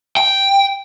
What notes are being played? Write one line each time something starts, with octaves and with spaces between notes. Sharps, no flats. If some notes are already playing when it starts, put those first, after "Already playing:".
G5